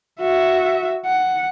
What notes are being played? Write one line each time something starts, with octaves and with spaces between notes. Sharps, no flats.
F#4 E5
F#5